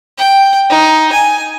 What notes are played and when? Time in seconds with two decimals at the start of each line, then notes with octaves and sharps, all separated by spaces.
0.18 G5
0.70 D#4
1.13 G#5